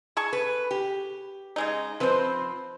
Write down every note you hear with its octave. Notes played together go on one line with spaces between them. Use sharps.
G#4 A5 C#6
B4
G4
C#3 G#3 D#4
F3 C4 B4 C5